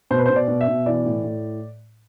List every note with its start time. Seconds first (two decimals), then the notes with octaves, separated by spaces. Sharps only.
0.11 B2 C5
0.19 B4
0.26 B2 C5
0.36 D5
0.48 B2
0.61 E5
0.68 B2
0.86 E3 D5
1.05 A2
1.24 A2